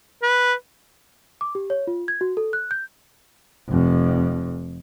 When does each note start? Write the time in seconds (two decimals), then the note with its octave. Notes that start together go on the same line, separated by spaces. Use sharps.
0.23 B4
1.41 D6
1.55 G4
1.70 C#5
1.87 F4
2.08 G#6
2.21 F#4
2.37 A4
2.53 F#6
2.71 G6
3.69 F1 F2